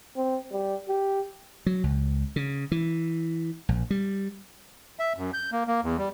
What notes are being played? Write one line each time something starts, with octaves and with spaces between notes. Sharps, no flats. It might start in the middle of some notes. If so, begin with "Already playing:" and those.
C4
G3
G4
F#3
C#2
C#3
E3
A#1
G3
E5
F#2
G6
A#3
A#3
E2
G3